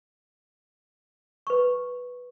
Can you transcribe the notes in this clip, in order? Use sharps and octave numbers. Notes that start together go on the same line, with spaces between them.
B4 C#6